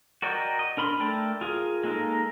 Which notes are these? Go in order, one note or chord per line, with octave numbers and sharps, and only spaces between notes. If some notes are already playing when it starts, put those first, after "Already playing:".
F#4 A#4 D5 D#5 G5
D#5
D4 A#4 B5 C6
A3 A4 A#4 D5 G5
F4 G#4 A#4
G#3 A#3 D#4 A4 A#4